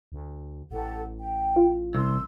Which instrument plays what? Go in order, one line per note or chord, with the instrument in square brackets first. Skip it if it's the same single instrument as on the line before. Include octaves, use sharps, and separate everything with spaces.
[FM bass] D2
[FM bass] A1 [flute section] G4 A4 F#5
[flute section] G5
[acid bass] F4
[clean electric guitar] C2 [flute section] C6 E6